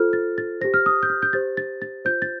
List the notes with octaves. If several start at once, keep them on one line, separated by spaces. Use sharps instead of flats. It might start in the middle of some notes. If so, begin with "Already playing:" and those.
Already playing: F4 A4 C5 F6
A6
A6
G4 C5 A#6
F6
D#6
G6
F6
G6
G4 C5 A6
A6
A6
F4 C5 G6
A6